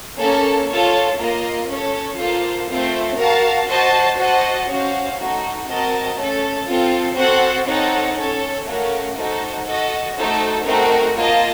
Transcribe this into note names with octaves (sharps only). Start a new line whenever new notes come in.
A#3 C#4 A4
F4 A4 C#5 A5
A#3 F4 A#4 D#5
C#4 A4 C#5
A#3 F4 A4 C5
A3 C4 F4 C5
F#4 A#4 F5 A5
F#4 C5 D#5 A5
F#4 C5 D#5 F#5 A5
C#4 F#4 C5 F5
A3 D#4 F#4
C4 F#4 A#4 D#5 A5
A3 C#4 A4
C4 F4 A4
C4 F#4 A4 C5 F#5
C4 D#4 A4 C#5 F#5
C#4 A4 C#5
A3 C#4 F#4 A#4 F5
A3 D#4 F#4 A4 C5
F#4 A4 D#5
A3 D#4 F#4 A4 C5
A3 C4 D#4 F#4 A#4
A#3 F4 A#4 D#5 A5